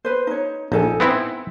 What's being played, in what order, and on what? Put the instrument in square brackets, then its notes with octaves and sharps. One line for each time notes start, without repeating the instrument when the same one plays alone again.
[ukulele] B4 C5
D#4 C#5
[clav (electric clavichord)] A#1 [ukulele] D#4 A4 G#5
[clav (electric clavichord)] B3 C4 E4